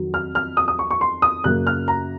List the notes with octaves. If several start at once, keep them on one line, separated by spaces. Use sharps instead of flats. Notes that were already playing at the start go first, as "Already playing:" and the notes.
Already playing: F2 D#3 F#3
F6
F6
D#6
D#6
C#6
C#6
C6
D#6
F#2 C#3 F#3 A#3 F#6
F6
A#5